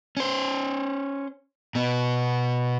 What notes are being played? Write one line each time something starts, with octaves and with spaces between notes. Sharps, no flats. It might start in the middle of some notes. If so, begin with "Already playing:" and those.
C#4 C5
B2 B3